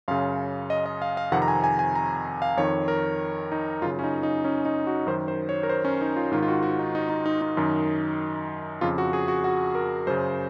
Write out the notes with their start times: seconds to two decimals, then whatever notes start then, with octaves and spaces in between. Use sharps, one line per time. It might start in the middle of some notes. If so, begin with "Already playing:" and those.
0.08 F#2 C#3 F5
0.70 D#5
0.86 D#5
1.02 F5
1.17 F5
1.32 F2 C3 D#3 F#5
1.42 A#5
1.48 G#5
1.64 G#5
1.79 G#5
1.95 A#5
2.42 F5
2.57 F2 D#3 C#5
2.88 A#4
3.52 D#4
3.82 F#2 F4
3.85 C#3
3.99 C#4
4.04 D#4
4.23 D#4
4.45 C#4
4.65 D#4
4.87 F#4
5.07 F#2 D#3 C5
5.28 C5
5.49 C#5
5.63 A#4
5.69 C5
5.85 C#4
6.01 D#4
6.16 F4
6.32 G#2 D#3 F4
6.42 F4
6.48 F#4
6.63 F#4
6.79 D#4
6.95 D#4
7.09 D#4
7.26 D#4
7.42 D#4
7.57 F#2 D#3
8.81 F2 C#3 F4
8.98 F#4
9.13 G#4
9.28 F#4
9.44 F#4
9.75 A#4
10.07 F#2 C#3 C5